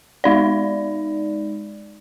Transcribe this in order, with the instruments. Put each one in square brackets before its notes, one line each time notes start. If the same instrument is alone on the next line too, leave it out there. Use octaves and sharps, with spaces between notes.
[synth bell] G#3 D#4 D5